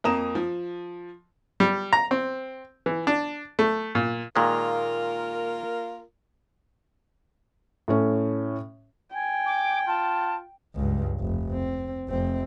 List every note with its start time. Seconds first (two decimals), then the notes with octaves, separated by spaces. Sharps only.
0.04 F2 A#3 A#5 D#6 E7
0.35 F3
1.60 G3
1.93 A#5
2.11 C4
2.86 E3
3.07 D4
3.59 A3
3.95 A#2
4.36 A#2 D#3 G#3 A#3 F4 A#4
7.88 A2 A3 C#4
9.15 G5 G#5
9.46 D6
9.87 F4 A5
10.75 C#2 G2
11.20 F1
11.52 C4
12.09 F1 C4